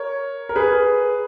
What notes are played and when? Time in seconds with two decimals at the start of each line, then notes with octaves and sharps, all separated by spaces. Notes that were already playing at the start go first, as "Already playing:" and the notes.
Already playing: A#4 C#5
0.49 A#4
0.56 G#4 B4